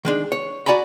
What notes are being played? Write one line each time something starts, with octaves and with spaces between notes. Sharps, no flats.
D#3 G#3 D4
C#5
F#4 D5 G#5 A#5 B5